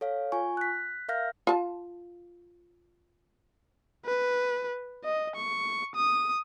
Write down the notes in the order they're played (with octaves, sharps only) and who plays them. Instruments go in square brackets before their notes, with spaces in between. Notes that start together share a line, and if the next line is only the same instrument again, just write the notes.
[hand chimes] A4 C#5 F5
F4 G#5 C#6
F#6 B6
A#4 E5 F5 F6 G6 A#6
[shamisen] F4 A5
[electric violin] B4
D#5
C#6
D#6